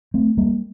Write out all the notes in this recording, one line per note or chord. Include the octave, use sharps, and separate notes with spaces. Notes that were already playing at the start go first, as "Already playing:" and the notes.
A3 C4
G3 A#3